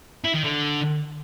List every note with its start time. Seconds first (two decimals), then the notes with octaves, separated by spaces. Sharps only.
0.24 E4
0.34 D#3
0.44 D3